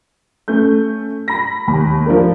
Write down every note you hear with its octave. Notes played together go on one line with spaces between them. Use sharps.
A3 C#4 G6
B5 A#6
D#2 B5
F3 D4 A#4